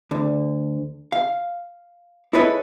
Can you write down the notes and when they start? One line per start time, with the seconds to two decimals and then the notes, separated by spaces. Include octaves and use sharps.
0.11 D2 D3
1.12 F5
2.33 E4 G#4 A4 B4 C#5 D#5